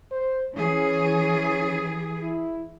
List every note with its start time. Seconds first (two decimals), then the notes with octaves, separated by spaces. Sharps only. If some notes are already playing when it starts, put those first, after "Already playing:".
0.11 C5
0.55 E3 C#4 G#4
2.22 E4